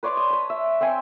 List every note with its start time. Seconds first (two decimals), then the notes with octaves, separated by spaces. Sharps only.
0.03 B4 C#5 D5 C6
0.17 D#5
0.30 C#5 A5
0.50 E5
0.81 C4 E5 G5 G#5